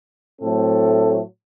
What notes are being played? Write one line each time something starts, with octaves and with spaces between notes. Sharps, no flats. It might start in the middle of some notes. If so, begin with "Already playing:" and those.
A2 F#3 A3 C4 A4